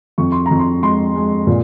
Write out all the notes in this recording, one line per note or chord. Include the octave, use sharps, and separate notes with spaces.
F2 C#6
C6
F2 A#5
C6
G#3 C6
G#3
A#2